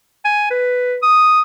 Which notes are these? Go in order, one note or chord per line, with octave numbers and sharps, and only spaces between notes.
G#5
B4
D#6